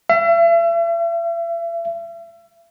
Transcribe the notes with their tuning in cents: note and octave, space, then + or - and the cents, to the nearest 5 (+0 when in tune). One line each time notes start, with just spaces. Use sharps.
E5 +40